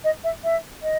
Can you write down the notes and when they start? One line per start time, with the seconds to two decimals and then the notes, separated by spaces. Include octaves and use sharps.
0.04 D#5
0.24 E5
0.44 E5
0.82 D#5